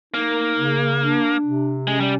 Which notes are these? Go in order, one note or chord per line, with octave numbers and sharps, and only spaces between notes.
A#3 D#4
C#3
D4
C3
G#3 C#4
G3